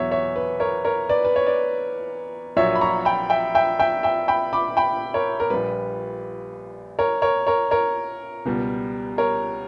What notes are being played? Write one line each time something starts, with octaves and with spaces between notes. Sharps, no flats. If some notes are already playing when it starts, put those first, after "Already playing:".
Already playing: E2 B2 F#3 C#5 E5
C#5 E5
B4
A#4 C#5
A#4 C#5
B4 D5
B4
C#5
B4 D5
A#1 A#2 F#3 C#5 E5
B5
A#5 C#6
G5 B5
E5 G5
E5 G5
E5 G5
E5 G5
G5 B5
B5 D6
G5 B5
A#4 C#5
A#4
A#1 A#2 G3 B4
A#4 C#5
A#4 C#5
A#4 C#5
A#4 C#5
C#2 B2 G3
A#4 C#5